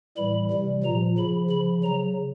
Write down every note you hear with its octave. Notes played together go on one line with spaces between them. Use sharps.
A2 E3 G3 B5
C3 E3 G3
A#2 F3 A#5
C#3 F3 B5
C#3 F3 B5
C#3 F#3 A#5